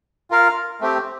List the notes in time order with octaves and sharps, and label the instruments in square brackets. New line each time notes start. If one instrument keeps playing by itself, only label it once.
[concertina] F4 A#4 F5
A3 C4 G4